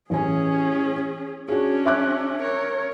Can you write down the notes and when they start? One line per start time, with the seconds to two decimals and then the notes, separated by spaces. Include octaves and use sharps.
0.10 A1 C#4 G#4 G#5
1.48 C#4 D4 F#4 G#4
1.86 E5 D6 F#6
2.42 A#4 C#5